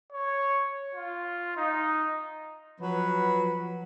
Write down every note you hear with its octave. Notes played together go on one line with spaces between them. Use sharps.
C#5
F4
D#4
F3 F#3 B4